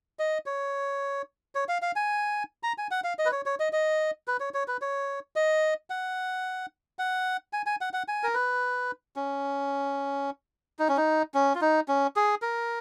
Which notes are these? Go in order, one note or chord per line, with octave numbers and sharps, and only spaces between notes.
D#5
C#5
C#5
F5
F5
G#5
A#5
G#5
F#5
F5
D#5
B4
C#5
C#5
D#5
D#5
B4
C#5
C#5
B4
C#5
D#5
F#5
F#5
G#5
G#5
F#5
F#5
G#5
A#4
B4
C#4
D#4
C#4
D#4
C#4
F4
D#4
C#4
G#4
A#4